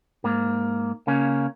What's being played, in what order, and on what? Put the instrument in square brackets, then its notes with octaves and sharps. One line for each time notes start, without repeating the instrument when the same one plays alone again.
[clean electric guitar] G#2 A#3
C#3 A#3 C#4